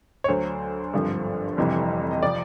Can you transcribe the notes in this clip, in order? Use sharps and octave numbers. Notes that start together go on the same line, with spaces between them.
C#5
D2 D3 F#3 C5
G#1 G2 D3 F3
F1 F2 C3 E3 G3
D#5
C3 F3 D5